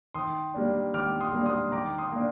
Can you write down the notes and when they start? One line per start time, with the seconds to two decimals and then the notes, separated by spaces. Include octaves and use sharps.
0.14 D#3 C6 D#6
0.54 G3 A#3 D4
0.94 D#3 D6 F6
1.21 C6 D#6
1.33 G3 A#3 D4
1.46 C6 D#6
1.72 D#3 A#5 D6
1.98 C6 D#6
2.12 A#3 D4